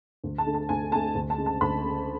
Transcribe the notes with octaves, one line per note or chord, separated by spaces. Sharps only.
D2
A5
D3 A3
A5
D2 G#5
D3 A3 A5
D2
A5
C#3 G#3
A5
D2 B5
C#3 G#3